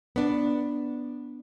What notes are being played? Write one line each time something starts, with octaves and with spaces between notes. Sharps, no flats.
B3 D4